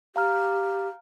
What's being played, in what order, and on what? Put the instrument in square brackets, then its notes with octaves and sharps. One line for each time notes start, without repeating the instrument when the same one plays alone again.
[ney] G4 [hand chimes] F5 A#5 F6